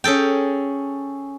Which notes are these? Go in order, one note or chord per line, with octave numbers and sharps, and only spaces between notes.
C#4 G#4 A4 G5